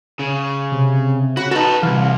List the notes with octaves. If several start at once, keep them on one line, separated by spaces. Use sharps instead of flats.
C#3
C3
C#3 F#4 B5
D#4 F#4 A4 B4 A5
C2 C3 E3 F5